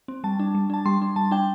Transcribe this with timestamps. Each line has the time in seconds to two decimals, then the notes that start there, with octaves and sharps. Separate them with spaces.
0.08 C4
0.24 G3 A5
0.39 D4
0.55 G3
0.70 D4 A5
0.86 G3 C6
1.02 D4
1.16 G3 A5
1.31 D4 G5